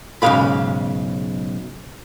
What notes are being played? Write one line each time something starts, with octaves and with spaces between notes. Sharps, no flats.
B1 G#2 C#3 G#3 F5 B5